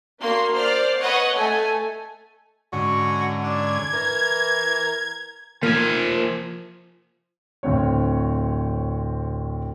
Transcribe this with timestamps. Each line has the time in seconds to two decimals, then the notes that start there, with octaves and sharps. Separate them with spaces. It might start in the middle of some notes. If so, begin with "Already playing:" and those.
0.21 A#3 D4 F#4 C6 C7
0.57 C5 D5 F6 C7
1.01 B4 C#5 D#5 F#5
1.33 A3 G#5
2.73 G#2 D3 C#4 F#4
3.43 D4 G#6
3.93 E3 A#4
5.63 F3 A#3 G#5
7.63 D1 C4 C#5